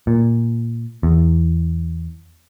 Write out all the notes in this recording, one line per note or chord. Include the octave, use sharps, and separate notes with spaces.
A#2
E2